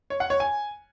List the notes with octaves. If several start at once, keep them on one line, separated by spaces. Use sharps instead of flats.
C#5
F#5
C#5
G#5